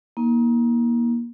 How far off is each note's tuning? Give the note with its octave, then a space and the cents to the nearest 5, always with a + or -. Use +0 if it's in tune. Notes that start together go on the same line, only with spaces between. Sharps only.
A#3 +25 D#4 +30